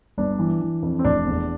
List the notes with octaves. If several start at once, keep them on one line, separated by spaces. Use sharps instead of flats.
G1 D4
E3
E3
F2
C4
F1 D4
E2